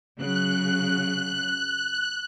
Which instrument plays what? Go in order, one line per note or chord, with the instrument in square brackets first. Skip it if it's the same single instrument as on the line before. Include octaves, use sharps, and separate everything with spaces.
[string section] C#3 F#3 [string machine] F#6